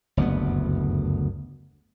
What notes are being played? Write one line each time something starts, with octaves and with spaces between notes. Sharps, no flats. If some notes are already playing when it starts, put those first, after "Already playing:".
F#1 D2 G2 B3